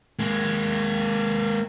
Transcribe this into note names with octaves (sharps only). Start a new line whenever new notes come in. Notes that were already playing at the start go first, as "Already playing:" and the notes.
G#3 A#3